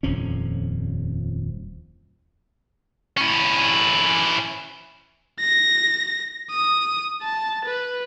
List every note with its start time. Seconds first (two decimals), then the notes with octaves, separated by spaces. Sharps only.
0.03 D#1 F2 F3 C#4
3.17 C#4 E4
5.40 A#6
6.51 D#6
7.22 A5
7.65 B4